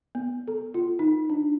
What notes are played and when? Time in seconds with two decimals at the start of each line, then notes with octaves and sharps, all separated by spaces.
0.15 B3
0.48 A4
0.74 F4
0.99 D#4
1.30 D4